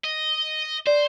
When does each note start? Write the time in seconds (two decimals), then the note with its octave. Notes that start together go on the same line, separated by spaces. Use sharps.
0.04 D#5
0.87 C5 D5